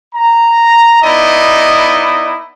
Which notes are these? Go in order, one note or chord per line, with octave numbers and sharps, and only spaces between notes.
A#5
B3 D#4 E4 D5 D#5